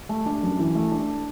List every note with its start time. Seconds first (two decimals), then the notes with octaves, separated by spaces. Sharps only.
0.09 A3
0.26 D4
0.43 F#2
0.59 E3
0.75 A3
0.92 D4